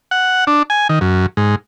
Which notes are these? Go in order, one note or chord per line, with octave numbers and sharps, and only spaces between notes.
F#5
D4
G#5
D#3
F#2
G#2